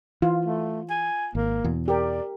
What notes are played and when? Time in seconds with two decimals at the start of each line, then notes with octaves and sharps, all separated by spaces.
0.22 E3 F4
0.45 A3
0.90 G#5
1.35 G#1 A#3
1.64 E2 B2
1.88 G4 A#4 D5